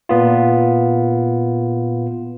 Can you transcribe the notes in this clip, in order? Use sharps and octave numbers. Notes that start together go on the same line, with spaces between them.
A#2 B3 F4